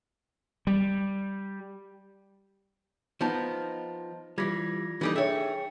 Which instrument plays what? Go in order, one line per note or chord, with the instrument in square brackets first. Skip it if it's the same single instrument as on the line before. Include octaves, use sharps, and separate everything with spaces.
[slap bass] G3
[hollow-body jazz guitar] F3 B3 D#4 [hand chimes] C5 A5
[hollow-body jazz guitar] E3 G3 [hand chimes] F4 G#6 A#6
[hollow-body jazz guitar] E3 G3 D#4 [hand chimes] D4 A4
[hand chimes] G#4 G5 C#7 [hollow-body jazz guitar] C#5 E5